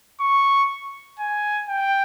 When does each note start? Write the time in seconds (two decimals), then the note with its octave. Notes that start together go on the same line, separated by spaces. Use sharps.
0.21 C#6
1.19 G#5
1.69 G5